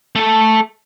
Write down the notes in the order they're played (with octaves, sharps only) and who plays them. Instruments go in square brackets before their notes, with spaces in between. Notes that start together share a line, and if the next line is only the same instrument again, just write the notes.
[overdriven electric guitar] A3 A4